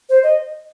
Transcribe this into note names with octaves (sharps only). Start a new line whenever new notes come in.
C5
D#5